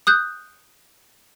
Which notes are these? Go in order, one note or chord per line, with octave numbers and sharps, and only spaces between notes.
D#6 F#6 G6